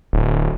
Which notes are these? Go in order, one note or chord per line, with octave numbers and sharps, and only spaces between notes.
D1